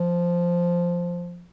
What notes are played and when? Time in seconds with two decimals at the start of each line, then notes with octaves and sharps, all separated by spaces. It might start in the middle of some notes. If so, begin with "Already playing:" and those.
Already playing: F3